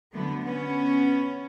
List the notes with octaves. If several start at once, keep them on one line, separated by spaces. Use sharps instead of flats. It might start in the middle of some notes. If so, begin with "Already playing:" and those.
D3 F#3 A3 B3
B3 C#4